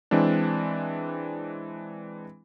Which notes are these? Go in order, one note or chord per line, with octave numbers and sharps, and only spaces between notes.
E3 G#3 C4 D4